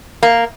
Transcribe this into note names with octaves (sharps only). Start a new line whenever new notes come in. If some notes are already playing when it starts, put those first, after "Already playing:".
A#3